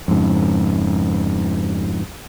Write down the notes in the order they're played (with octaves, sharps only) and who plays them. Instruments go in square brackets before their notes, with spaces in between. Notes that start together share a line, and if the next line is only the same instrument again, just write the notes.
[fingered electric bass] F2 G#2 C#3